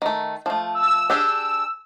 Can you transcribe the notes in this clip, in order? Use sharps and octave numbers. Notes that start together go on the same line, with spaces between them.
D#3 A3
F3 A3
E6
D4 G4 G#4